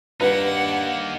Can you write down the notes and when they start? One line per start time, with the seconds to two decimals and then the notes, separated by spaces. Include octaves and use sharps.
0.21 G2 A#3 D#4 B4 F#5